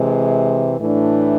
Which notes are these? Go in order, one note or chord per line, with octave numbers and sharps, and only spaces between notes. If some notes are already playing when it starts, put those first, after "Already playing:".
Already playing: C3 E3 G#3
A2 E3 A3 D4